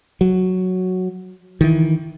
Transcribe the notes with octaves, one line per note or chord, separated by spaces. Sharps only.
F#3
D#3 E3